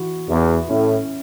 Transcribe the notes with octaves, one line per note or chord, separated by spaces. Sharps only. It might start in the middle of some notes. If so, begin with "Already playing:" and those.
Already playing: E3 F#4
E2 E4
A2 C#4